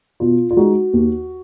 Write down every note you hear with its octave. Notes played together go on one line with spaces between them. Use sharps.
B2 F4
F4
G#3 D#4 F#4
D#2